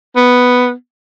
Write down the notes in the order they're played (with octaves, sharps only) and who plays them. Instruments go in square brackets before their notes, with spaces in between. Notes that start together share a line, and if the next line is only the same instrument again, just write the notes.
[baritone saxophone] B3